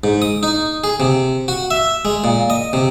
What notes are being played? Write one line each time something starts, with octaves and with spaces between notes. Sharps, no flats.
G#2
D#6
D#4
G#4
C3
F#4
E5
G#3
A#2
D#5
C3